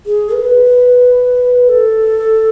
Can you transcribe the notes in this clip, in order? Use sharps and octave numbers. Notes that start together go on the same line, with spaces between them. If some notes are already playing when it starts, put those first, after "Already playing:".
G#4
B4
A4